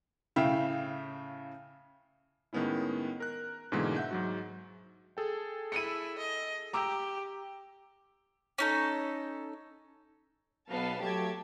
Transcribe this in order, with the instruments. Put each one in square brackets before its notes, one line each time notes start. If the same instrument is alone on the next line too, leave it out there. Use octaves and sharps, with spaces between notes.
[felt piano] A2 C#3 E4 E5 F5 G5
[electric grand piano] A2 D#3 G#3 B3 C#4 E4
A#4 F#6
G#2 B2 D3 E3 G#3 A#3
E5 F#5 G6
G#2 F#3 F#4
G#4 A4 G5
[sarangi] E4 [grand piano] C#7 D#7
[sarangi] D#5
[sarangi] G4 [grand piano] A#5 D6 E6
[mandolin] C#4 D#4 A4
[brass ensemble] B1 [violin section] B3 F5 A5
[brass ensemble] F#3 A3 [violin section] G4 A5 G#6